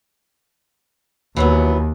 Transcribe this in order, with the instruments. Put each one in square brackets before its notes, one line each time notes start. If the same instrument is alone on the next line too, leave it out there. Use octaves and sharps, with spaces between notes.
[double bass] D#2 [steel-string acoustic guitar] E3 F#3 B3